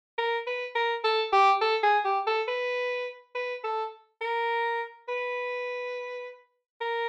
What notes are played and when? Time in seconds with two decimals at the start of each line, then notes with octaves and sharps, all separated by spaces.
0.18 A#4
0.47 B4
0.76 A#4
1.04 A4
1.33 G4
1.61 A4
1.83 G#4
2.05 G4
2.27 A4
2.48 B4
3.35 B4
3.64 A4
4.21 A#4
5.09 B4
6.81 A#4